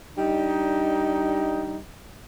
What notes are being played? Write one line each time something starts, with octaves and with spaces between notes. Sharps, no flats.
G3 D4 D#4